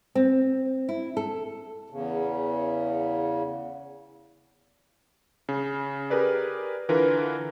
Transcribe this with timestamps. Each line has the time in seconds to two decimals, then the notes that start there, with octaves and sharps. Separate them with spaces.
0.15 C4
0.89 E4
1.17 A4
1.90 E2 C#3
5.49 C#3
6.10 G4 G#4 A#4 B4 D5
6.89 D3 E3 F4 A#4 B4